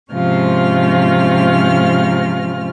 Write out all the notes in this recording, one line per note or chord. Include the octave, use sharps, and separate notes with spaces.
G#2 C3 F3 C#4 F4 F6